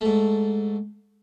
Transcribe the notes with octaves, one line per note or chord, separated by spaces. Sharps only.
G#2 A3